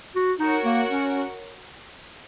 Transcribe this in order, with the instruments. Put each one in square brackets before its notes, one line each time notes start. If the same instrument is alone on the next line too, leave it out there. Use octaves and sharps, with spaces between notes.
[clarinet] F#4
[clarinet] D#4 [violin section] F#4 A#4 C#5 F#5
[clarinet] A#3
C#4